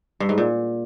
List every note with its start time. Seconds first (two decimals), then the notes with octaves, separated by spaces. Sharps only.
0.20 G2
0.29 G#2
0.38 A#2